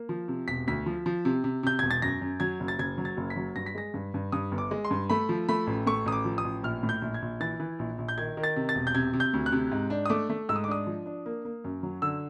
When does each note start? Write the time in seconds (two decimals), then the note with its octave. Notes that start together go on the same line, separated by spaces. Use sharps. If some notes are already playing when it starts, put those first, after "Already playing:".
Already playing: A#3
0.09 F3
0.28 C3
0.48 E1 B6
0.67 D2 B6
0.86 F3
1.06 F3
1.25 C3
1.44 C3
1.63 C3 G6
1.79 E1 G#6
1.91 A6
2.02 F#2 A#6
2.21 F#2
2.40 F#3 G#6
2.60 F#1
2.68 A6
2.79 F#1 G#6
2.98 F#3
3.05 A6
3.17 F#1
3.30 B6
3.36 F#3
3.56 G2 A#6
3.66 B6
3.75 G#3 A#6
3.94 G2
4.14 G2
4.32 G2 D#6
4.52 G1
4.58 D6
4.71 G#3
4.85 C6
4.91 G2
5.10 A3 B5
5.29 F3
5.49 A3 B5
5.67 A1
5.87 A3 C#6
6.06 A1 D#6
6.12 D6
6.25 F3
6.38 D#6
6.45 A1
6.63 A#1 F6
6.83 A2
6.89 G6
7.02 A#1
7.14 G#6
7.22 A#1
7.40 E3 A6
7.60 E3
7.79 A#1
7.98 A#1
8.09 G6
8.18 D#3 G#6
8.37 D#3
8.44 A6
8.56 C3
8.69 A6
8.75 E1
8.87 G6
8.95 C3 G#6
9.14 C3
9.20 G6
9.34 D2
9.46 F#6
9.52 C3
9.72 G#2
9.90 D4
10.06 D#6
10.09 A3 D6
10.30 A3
10.49 G#2 E6
10.56 D#6
10.64 D6
10.68 D4 D#6
10.87 F3
11.06 D4
11.26 A#3
11.45 A#3
11.64 F#2
11.83 F#3
12.02 D3 E6